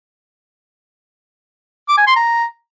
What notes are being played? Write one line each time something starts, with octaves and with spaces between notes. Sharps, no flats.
D6
G#5
C6
A#5